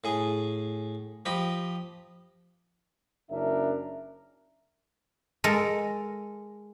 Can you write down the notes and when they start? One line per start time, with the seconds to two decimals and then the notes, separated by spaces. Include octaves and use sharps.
0.04 A2 G#4 G#5
1.26 F3 G4 D#5 B5
3.30 F#1 C#4 D4 A#4 E5
5.44 G#3 A4 A#4